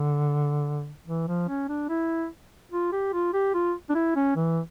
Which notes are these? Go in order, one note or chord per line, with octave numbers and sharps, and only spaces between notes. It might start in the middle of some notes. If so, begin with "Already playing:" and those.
Already playing: D3
E3
F3
C#4
D4
E4
F4
G4
F4
G4
F4
D4
E4
C#4
E3